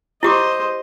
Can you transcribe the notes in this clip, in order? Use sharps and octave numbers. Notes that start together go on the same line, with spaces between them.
E4 G4 C5 D#5 D6